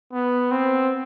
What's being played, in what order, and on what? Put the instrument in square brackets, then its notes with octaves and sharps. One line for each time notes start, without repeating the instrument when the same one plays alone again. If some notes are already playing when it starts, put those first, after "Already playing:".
[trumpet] B3
C4